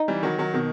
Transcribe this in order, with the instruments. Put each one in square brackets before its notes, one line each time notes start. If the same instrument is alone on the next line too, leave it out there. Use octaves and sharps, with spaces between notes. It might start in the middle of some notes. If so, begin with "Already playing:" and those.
Already playing: [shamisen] D#4
[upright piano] E3 G3
D#3 F#3
D#3 F#3
B2 D#3